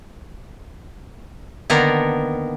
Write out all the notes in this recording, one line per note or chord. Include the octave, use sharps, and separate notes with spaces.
D3 D#3 A#3 B3 A#4